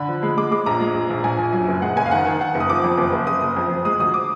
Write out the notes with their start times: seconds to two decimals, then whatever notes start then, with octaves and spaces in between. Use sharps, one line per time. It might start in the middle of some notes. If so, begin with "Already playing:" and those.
Already playing: D3 B5
0.08 F3
0.23 G#3
0.37 G#3 D6
0.51 G#3 D6
0.66 A#1 A#5
0.80 G#3
0.95 A#1
1.10 A#1
1.24 A#1 G#5
1.38 A#1
1.53 F#2
1.68 F#1
1.82 G#3 F#5
1.96 F#1 G#5
2.06 F5
2.11 D#3 F#5
2.26 D#3
2.40 D#3 F#5
2.55 F#1
2.60 D#6
2.69 F3 D6
2.84 F2
2.98 F#1
3.13 F#1
3.27 F#1 D#6
3.42 F#1
3.57 F2
3.71 F3
3.85 G#3 D#6
3.99 D2 D#6
4.14 D6